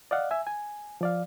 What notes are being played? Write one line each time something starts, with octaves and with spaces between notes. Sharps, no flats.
D5 D#5 F5 F#5
E5 G#5
G#5
F3 D5 F5